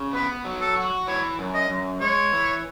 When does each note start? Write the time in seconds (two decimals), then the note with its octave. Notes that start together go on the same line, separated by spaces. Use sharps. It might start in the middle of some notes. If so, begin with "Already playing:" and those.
Already playing: C#3
0.13 B3 B4
0.45 F#3
0.61 A4
0.76 F#4
1.07 E3 C#5
1.39 F#2
1.54 D#5
1.69 F#2
2.01 G#3 C#5
2.33 E3